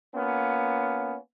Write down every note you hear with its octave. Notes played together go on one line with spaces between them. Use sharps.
A#3 B3 C#4 F4